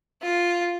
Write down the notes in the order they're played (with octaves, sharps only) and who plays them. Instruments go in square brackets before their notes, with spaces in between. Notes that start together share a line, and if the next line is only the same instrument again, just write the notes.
[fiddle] F4